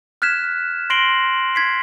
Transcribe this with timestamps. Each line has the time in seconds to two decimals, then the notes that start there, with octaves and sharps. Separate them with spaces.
0.22 F6 F#6 G#6 B6 E7
0.90 C6 A#6 C7 D7 F#7 G7
1.55 G#6 B6 C7